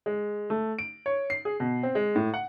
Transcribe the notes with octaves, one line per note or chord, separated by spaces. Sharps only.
G#3
A3
D7
C#5
C7
G#4
B2
C4
G#3
A2
F#5